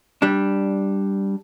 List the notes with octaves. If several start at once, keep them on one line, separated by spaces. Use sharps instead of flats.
G3 D4